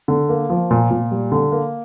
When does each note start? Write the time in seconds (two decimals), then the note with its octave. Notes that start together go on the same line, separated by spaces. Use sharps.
0.08 D3
0.29 A#3
0.50 F3
0.71 A#2
0.91 A#2
1.11 G3
1.32 D3
1.52 A#3